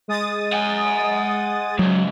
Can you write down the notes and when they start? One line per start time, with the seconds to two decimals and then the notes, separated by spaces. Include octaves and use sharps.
0.08 G#3 D#6 A6
0.52 F#5 G#5
1.79 G#2 C#3 F#3